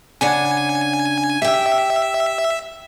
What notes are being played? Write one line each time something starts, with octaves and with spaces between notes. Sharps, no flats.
C#3 D4 F#5 G#5
G4 E5 G5